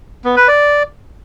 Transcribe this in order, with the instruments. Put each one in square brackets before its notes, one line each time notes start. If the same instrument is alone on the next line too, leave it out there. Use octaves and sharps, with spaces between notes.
[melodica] B3
B4
D5